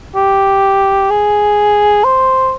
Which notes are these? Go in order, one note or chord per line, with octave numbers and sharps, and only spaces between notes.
G4
G#4
C5